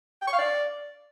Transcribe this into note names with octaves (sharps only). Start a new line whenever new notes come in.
G5
C#6
F5
D5